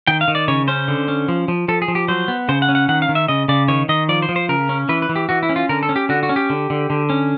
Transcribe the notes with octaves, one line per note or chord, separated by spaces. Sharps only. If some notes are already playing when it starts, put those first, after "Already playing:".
D#3 G5
F5
D#3
D5
C#3 C#5
C#4 C5
D3
C#4
F3
F3
F3 A4
G#4
F3
G4
F#3 C5
B3
C#3 C5
F#5
C#4
F#5
D#3 F#5
F5
D#3
E5
C#3 D#5
C#3 D5
D#3 C#5
D#3 D#5
F3 D5
C5
F3
C5
C#3 A#4
C#4
E3 B4
B4
E3
G4
E3 F#4
E4
C#4
F4
D3 A#4
A4
C#4
G4
D3 F#4
F#4
C#4
G4
D3
D3
D3
C#4